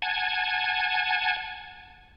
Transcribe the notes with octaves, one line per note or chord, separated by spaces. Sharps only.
F#5 G#5 A5 G#6